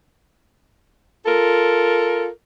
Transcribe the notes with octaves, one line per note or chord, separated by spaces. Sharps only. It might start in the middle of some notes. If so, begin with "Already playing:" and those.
F4 A4 A#4